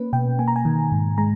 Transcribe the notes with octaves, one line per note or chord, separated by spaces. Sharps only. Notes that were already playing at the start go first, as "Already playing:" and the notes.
Already playing: A#3 C#4 B4
B2 G5
A#3 G#5
A#5
G#5
D#3
G#2
G#3 A#5